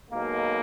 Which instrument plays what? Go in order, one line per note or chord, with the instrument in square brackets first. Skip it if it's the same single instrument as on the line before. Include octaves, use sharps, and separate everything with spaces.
[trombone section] B1 B2 G#3 A#3